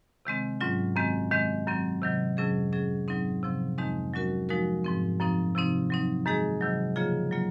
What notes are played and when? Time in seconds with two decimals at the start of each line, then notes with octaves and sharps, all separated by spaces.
0.25 C3 D#3 G#3 C4
0.61 G#2 F#3 C#4 F4
0.96 F#2 D#3 G#3 C4
1.31 D#3 G#3 C4
1.67 F#2 D#3 F#3 C4
2.02 C3 D#3 F#3
2.37 F2 C3 F#3 C#4 G#4
2.72 F#3 C#4 G#4
3.08 G#2 F#3 C4 D#4
3.43 C3 F3 C4
3.78 F2 D#3 G#3 C4 D#4
4.14 F#3 C#4 F#4 A#4
4.49 F3 G#3 D#4 F#4 A#4
4.85 G#2 F3 C4
5.19 F#2 F3 C4 D#4
5.55 C3 F3 C4 D#4
5.90 F#3 C4 D#4
6.26 F#2 D#3 G#3 D#4 G#4
6.61 C3 D#3 F#3
6.96 C#3 F3 A#3 F4 G#4
7.31 F#3 A#3 F4